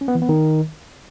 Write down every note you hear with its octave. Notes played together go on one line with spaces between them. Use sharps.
C#4
B3
E3
B3
D#3